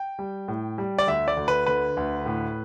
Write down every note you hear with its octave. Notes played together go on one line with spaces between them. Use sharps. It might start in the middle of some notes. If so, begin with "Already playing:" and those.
Already playing: G5
G3
A2
G3
D5
D2 E5
D5
D2
B4
D3 B4
D2
A2